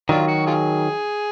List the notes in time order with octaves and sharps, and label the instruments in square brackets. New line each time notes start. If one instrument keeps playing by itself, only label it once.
[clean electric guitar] D#3 F#3 [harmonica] D4 F4
[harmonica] F#4
F4 G#4